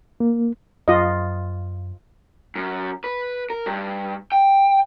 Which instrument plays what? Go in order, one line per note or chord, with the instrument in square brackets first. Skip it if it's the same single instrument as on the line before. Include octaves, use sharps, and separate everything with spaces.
[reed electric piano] A#3
[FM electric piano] F#2 [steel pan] F4 D#5
[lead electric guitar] F#2
B4
A#4
G2
G5